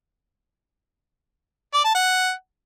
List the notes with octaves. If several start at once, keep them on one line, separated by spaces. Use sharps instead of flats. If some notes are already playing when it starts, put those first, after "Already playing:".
D5
A5
F#5